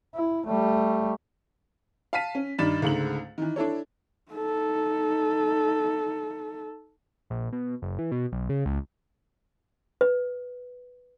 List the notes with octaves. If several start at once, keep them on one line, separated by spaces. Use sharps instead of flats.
E4
G3 A3
F5 A5 B6 D#7
C#4
G2 D#3 D5 B5 A6 E7
C#2 G#2 D3 A3 F#7
D#3 E3
D4 E4 A4 C#5
D#4 A4
A#1
B2
F#1
E3
B2
B1
C#3
C#2
B4